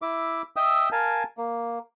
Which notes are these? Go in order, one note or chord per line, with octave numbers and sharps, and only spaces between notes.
E4 E5 D6
D#5 E5 G5 D#6 E6
A#4 F5 G#5 A5
A#3